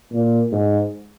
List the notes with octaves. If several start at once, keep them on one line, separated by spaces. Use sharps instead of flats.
A#2
G#2